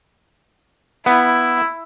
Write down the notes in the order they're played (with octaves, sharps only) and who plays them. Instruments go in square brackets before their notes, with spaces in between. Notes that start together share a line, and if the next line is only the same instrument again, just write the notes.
[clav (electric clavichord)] B3 [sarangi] E4